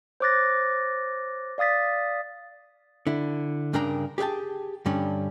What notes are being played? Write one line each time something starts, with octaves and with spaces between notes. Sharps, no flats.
C5 C#5 D6 F#6 A6 A#6
D5 F5 D#6 A6 B6
D3 E4
G2 C#3 D4 A#4 G5 A#5
G4 G#4 B4 G5 A5
G2 D3 G3 C#4